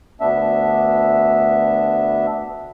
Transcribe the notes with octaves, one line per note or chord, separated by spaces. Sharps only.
D2 B3 D4 E5